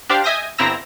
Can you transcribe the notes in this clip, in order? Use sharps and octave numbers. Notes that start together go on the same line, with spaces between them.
D4 G4 C5 F5 G5
D#5 E5 G#5 D#6 G6 A#6
G1 C4 E4 A#5 E6 A#6